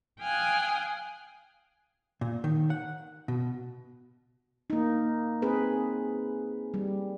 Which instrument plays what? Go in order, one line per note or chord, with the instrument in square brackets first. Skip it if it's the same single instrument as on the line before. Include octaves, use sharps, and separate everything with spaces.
[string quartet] F5 G5 G#5 D#6 F6 F#6
[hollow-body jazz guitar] A#2
D#3
F#5
B2
[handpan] A#3 D#4
C4 G#4 B4
G3